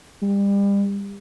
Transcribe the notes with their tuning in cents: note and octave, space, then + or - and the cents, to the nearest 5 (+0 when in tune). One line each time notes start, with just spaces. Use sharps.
G3 +35